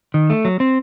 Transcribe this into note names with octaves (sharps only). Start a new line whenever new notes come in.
D#3
A3
F#3
C4